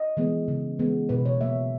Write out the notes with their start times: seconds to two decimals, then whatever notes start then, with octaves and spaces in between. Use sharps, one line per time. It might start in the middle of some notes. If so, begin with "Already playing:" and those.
Already playing: D#5
0.17 E3 G#3 B3
0.48 C#3
0.79 E3 G#3 B3
1.09 B2 B4
1.25 C#5
1.41 F#3 A#3 E5